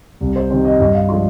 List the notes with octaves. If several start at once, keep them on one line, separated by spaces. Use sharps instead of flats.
C2
C5
C3 D#3 C5
D#5
G2 D#5
F5
F3 G#3 D4 F4 C6